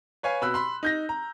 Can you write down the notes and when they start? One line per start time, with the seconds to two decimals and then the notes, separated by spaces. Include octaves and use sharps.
0.23 B4 C#5 F5 G#5
0.42 B2 B5 E6 F#6
0.54 B5 C6
0.83 D#4 G6 A#6
1.09 A#5